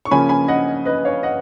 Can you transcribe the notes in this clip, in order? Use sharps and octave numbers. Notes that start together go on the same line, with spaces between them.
C#6
C#3 F3 A#3 C#4 G#5 B5
G#5 B5
D#5 F#5
B4 D#5
C#5 F5
D#5 F#5